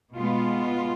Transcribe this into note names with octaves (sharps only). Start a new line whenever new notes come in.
B2 G#3 B3 F4